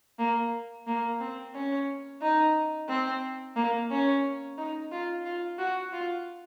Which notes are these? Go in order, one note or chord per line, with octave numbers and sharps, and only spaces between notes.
A#3
A#3
C4
C#4
D#4
C4
A#3
C#4
D#4
F4
F4
F#4
F4